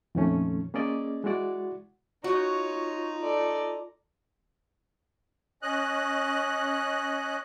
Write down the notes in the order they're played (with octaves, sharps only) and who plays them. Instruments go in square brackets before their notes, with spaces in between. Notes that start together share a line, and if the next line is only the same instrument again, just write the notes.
[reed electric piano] F2 A#2 D#3 F3 A3 C#4
A#3 C#4 G#4 D5 D#5
G#3 E4 F#4 D5 F#5
[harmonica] D#4 A#5 [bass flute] F4 [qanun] F#4 [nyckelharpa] C#5
[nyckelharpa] A4 D5
[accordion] C#4 D#5 F#6